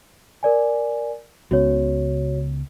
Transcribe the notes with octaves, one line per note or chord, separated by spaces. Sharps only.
A#4 D5 G#5
C#2 C#3 B3 F#4 C#5